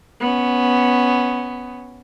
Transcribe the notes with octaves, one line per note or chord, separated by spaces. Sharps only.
B3 C#4